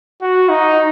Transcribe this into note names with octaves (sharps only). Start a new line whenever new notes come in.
F#4
D#4